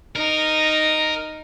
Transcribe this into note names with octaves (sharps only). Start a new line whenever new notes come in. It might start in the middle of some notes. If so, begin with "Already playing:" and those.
D#4 A#4